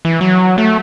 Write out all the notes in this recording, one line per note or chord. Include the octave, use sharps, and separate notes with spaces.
E3
F#3
A3